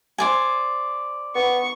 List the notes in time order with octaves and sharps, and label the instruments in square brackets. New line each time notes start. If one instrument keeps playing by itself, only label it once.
[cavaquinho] C5 D5 G#5
[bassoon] B3 [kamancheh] C#6